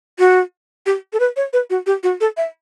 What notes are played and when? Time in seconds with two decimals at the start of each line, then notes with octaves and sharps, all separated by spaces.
0.19 F#4
0.86 G4
1.13 A4
1.20 B4
1.36 C#5
1.53 B4
1.70 F#4
1.87 G4
2.03 F#4
2.21 A4
2.37 E5